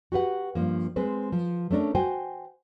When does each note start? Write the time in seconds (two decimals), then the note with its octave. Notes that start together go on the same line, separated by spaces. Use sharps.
0.12 F#4 G4 B4 F#5
0.55 G2 F3 A#3
0.96 G#3 C4 B4 C5
1.32 F3
1.71 A3 C#4 D4 A#4
1.95 F#4 C5 G5 G#5